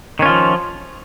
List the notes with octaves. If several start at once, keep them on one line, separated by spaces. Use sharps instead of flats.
D#3 F3 C#4 F4